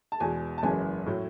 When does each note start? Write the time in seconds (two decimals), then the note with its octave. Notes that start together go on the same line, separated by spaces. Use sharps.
0.12 A5
0.20 E2 B2 G#3 G#5
0.58 A5
0.63 F#1 F#2 E3 G#3 G#5
1.06 A2 F#3 A3